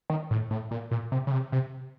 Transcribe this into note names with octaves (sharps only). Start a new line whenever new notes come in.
D#3
A2
A2
A#2
A#2
C3
C#3
C3
C3